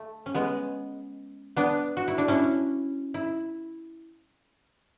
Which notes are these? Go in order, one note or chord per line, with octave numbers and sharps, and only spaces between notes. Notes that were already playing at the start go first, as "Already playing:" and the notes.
Already playing: A3
C#4
G#3 B3
B3 D4
F#4
E4
D4
C#4 E4
E4